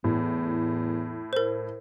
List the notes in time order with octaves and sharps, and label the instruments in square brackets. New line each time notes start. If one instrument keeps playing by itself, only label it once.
[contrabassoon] E2 [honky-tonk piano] A2
[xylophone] A#4 C5